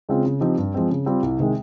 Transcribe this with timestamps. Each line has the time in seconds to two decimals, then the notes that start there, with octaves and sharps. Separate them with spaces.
0.09 C#3 G#3 C4 F4
0.25 C#3
0.41 F3 C4 D#4 G4
0.58 G2
0.74 F3 G#3 C4
0.90 C#3
1.06 G3 C4 F4
1.23 C2
1.39 C3 D#3 G#3